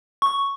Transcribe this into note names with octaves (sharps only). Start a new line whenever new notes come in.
C#6